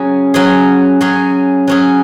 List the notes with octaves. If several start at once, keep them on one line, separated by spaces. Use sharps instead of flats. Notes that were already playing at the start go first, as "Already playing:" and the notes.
Already playing: F#3 C#4 G#4
F#3 C#4 G#4
F#3 C#4 G#4
F#3 C#4 G#4